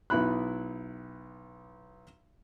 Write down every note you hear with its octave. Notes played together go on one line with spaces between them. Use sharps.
B1 B3 E4 B5 F#6